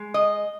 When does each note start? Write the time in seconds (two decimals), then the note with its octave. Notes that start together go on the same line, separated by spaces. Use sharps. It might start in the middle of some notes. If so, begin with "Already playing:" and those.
Already playing: G#3
0.14 D#5